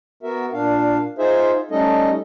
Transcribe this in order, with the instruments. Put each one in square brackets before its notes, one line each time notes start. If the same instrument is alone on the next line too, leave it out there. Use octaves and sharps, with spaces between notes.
[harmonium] B3 F#4 A#4 E5
A#2 D4 F5
D#4 F4 G#4 C5 E5
G3 A3 C#4 D#4 A4 D#5